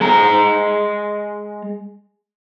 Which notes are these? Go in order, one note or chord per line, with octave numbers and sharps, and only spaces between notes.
G#3 A#5